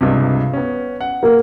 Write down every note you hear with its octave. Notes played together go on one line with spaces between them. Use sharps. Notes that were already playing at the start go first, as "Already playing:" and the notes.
C#2 G2 C3
B3 C#4
F#5
A#3